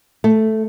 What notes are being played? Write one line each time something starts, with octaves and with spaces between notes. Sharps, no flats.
A3